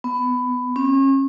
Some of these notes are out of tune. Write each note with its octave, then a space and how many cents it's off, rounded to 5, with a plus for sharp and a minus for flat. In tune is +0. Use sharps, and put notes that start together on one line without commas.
B3 +15
C#4 -35